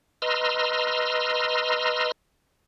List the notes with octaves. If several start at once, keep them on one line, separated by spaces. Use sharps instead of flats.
B4 D#5 A#5 C6 E6 F6